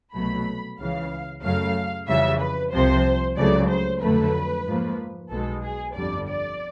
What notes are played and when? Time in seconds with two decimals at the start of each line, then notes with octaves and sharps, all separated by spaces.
0.14 C2 B2 F#3 A3 B5
0.78 C#2 C#3 E3 F5
1.43 F#2 C#3 F#3 A3 F5
2.08 F2 C#3 E3 G3 E5
2.39 B4
2.72 C2 C3 F3 C5
3.36 C#2 C#3 F#3 A3 D5
3.68 C5
4.01 F2 D3 F#3 A3 B4
4.65 G#2 F3 A#3
5.30 B1 B2 G#3 A4
5.62 G#4
5.94 G1 F2 D3 G3 D5
6.27 D5